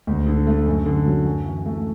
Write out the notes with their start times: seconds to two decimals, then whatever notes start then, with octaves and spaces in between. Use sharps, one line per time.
0.07 D2
0.26 D3
0.47 A3
0.66 F#2
0.86 D3
1.06 F#3
1.25 F#2
1.46 E3
1.66 A3